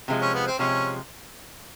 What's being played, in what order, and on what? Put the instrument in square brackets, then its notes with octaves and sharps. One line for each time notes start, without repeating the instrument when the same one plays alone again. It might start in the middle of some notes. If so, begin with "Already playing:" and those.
[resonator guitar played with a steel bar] C3 F3 G#3
[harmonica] C#4
B3
C4
[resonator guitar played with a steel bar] C3 F3 G#3 [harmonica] C#4